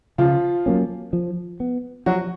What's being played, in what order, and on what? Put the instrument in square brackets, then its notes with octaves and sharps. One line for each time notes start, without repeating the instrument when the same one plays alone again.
[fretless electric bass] C#3 [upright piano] F3 F4
[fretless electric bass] F#3 A#3 C#4
F3
B3
[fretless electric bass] F3 [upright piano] F#3 F#4